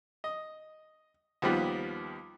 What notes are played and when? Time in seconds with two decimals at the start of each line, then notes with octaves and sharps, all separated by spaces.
0.24 D#5
1.42 D#2 F3 G3 B3